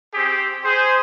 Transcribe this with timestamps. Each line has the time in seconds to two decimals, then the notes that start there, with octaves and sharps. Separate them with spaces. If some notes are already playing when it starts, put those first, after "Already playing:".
0.13 C4 G4 G#4
0.64 G#4 C5